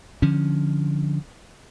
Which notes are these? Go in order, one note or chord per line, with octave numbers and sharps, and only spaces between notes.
D3 F3 C#4